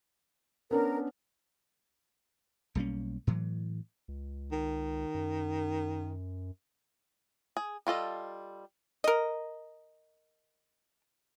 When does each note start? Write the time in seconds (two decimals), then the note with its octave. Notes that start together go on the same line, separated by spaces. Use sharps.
0.71 B3 C#4 D4 A#4
2.75 B1 G3 A#3 C#4
3.27 A2 E3 F#3
4.08 C#2
4.52 D#3
5.14 F#2
7.57 G#4
7.87 G3 F4 A4 D#5
9.04 A#4 D#5